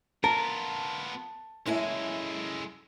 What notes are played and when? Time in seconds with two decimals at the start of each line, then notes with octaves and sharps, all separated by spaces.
0.24 B3 F4 A#4 A5
1.66 F#2 G#3 E4 A4 G#5